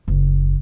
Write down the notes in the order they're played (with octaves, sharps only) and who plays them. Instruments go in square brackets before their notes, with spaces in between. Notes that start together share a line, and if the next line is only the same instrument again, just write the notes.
[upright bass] F#1